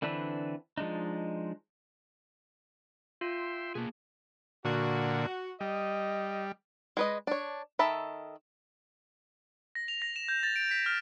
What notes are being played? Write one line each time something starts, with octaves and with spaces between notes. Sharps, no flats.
D3 E3 C4 D4 B4
F3 G#3 D4 D#4
F4 E5 G5 C6
B2 A#3 G#4
A#2 D3 F#4
G3 D#5
G#3 B4 D#5
D4 C#5
D#3 A4 E5 B5
A#6
F7
A#6
E7
G6
A6
D7
B6
F6